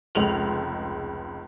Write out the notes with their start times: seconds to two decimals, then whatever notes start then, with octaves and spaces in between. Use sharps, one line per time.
0.15 F1 C#2 G#3 F7 F#7